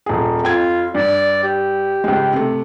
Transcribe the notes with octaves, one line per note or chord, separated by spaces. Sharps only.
D#1 G#4
F2 F4 G5 G#6
G2 D5
G4
C#2 G#3
C3 A3